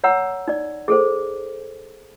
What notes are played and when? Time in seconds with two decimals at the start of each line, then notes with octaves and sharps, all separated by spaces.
0.04 C#5 F#5 A#5 E6
0.48 D#4 D5
0.88 G#4 A4 C5